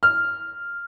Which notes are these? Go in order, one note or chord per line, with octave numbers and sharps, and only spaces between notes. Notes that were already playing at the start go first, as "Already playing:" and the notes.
F6